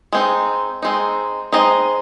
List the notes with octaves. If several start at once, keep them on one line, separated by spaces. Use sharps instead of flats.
G#3 C4 D#4
G#3 C4 D#4
G#3 C4 D#4 D#5